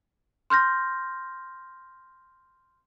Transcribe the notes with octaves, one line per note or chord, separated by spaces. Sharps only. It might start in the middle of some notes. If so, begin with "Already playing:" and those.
C6 F6 G6 A#6